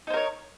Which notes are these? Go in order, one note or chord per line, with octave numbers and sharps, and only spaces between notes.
D#4 A#4 C5 C#5